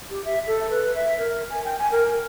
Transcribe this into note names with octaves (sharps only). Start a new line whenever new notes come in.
G4
E5
A4
B4
E5
A#4
G#5
G5
G#5
A#4